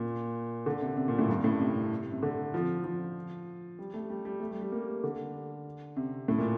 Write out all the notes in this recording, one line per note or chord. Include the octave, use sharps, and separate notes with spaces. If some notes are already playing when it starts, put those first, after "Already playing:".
Already playing: A#2
D3
C3
C3
A#2
A2
G2
A2
C3
C3
D3
F3
F3
G3
A3
G3
G3
A3
G3
G3
A#3
D3
C3
A2
A#2